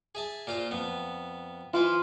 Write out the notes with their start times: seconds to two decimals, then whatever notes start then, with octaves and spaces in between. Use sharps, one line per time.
0.15 G#4 E5 A5
0.47 A#2 F4 C5
0.71 F2 B3
1.74 E3 F4 B4 C5